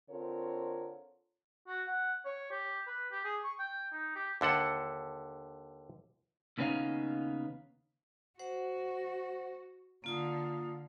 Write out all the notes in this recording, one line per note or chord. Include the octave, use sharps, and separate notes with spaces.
D3 C4 F4 A#4 C#5
F#4
F#5
C#5
G4
B4
G4
G#4
C#6
G5
D#4
G4
D#2 D3 A4 F#5
D#2 C#3 B3 C#4 D#4 F5
F#4 C5 F#5
D3 A#3 F4 F5 D#6